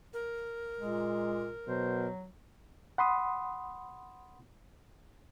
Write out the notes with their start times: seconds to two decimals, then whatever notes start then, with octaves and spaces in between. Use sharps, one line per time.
0.14 A#4
0.79 A#2 G#3
1.68 B2 F#3 C5
2.98 F#5 B5 C6 D#6